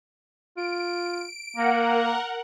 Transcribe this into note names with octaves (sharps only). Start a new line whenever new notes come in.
F4 D7
A#3 A#4 F#5